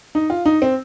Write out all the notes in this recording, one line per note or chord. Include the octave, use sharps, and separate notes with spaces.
D#4
F4
D#4
C4